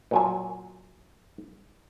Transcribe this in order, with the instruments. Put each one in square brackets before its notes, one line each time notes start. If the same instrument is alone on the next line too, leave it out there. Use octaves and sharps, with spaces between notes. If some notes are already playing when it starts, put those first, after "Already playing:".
[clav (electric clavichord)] A#2 F#3 G#5